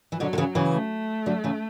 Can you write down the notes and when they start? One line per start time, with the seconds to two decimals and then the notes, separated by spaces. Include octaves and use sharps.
0.12 E3
0.20 B2 D3 F#3
0.33 D3
0.38 C#3 E3
0.55 C#3 E3
0.73 A3
1.26 D3 F#3
1.44 C#3 E3